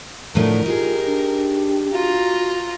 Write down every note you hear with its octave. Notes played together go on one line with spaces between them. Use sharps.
A2 D3 F3 A3 A#4
D#4 F4 G4 G#4
D4
F4 F#4 A#5